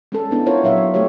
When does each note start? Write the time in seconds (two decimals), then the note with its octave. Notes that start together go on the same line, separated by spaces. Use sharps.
0.12 G#3 C#4 A4
0.31 B3 D4 E4
0.46 E4 F4 A#4 C5 C#5
0.63 A#2 F#3 C#5 E5 F5
0.94 A3 G4 C5 C#5